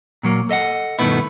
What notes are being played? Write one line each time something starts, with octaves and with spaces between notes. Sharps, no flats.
A#2 F#3 A#3
A4 D#5 E5 F#5
G2 B2 D#3 A3 B3 E4